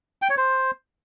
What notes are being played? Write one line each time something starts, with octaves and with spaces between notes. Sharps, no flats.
G5
C#5
C5